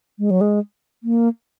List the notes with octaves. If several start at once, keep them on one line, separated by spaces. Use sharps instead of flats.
G#3
F#3
G#3
A#3